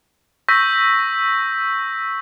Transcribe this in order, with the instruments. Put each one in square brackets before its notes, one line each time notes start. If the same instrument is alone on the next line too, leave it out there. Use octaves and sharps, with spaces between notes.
[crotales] C#6 E6 G6 A#6 B6